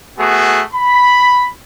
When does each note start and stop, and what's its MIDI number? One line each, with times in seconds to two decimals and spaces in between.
0.19 0.61 57
0.19 0.61 59
0.19 0.61 66
0.19 0.61 68
0.74 1.46 83